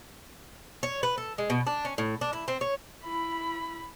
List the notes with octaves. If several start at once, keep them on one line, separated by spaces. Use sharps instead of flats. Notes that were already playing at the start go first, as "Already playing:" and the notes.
C#5
B4
A4
G#3
B2
D4
C#4
A2
D4
E4
C4
C#5
E4 B5